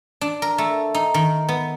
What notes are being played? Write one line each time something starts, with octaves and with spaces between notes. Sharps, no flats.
D4
A#4
A3
D#4
D#3
B3